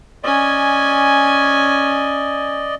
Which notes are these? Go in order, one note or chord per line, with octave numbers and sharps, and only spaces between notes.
C#4 D5 D#5 G#5